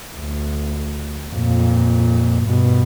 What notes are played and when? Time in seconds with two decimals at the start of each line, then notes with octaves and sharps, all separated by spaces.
0.17 D2
1.31 F2 A#2
2.44 G2 B2